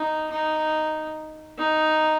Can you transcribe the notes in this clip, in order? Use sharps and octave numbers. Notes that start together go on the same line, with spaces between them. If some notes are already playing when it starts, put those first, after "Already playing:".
Already playing: D#4
D#4
D#4